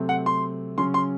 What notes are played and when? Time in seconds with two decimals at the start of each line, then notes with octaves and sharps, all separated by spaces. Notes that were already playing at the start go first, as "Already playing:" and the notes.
Already playing: C3 F#3 A3 C4
0.09 F#5
0.26 C6
0.78 C#3 F#3 C#4 C6
0.94 C6